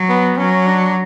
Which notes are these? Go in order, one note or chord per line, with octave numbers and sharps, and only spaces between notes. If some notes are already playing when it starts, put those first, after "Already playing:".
Already playing: F#3
B3
F#3 C#4
D4